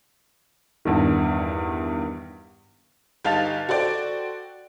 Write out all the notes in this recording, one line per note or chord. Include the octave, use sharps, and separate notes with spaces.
E2 G2 D#3
G1 D#4 F5 A5 A6 F7
F#4 A4 C5 D5 G5